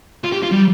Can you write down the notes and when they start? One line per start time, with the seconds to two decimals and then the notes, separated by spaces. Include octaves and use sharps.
0.24 F4
0.32 G4
0.43 F4
0.52 G3